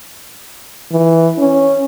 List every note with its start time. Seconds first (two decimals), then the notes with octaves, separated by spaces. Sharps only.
0.92 E3
1.38 C#4